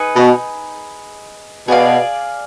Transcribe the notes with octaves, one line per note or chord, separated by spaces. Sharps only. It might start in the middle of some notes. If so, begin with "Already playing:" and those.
Already playing: D#4 G#4 B4
B2
B2 G#4 D5 F5